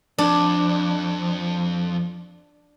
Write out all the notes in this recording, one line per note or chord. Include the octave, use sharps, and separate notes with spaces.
F2 D4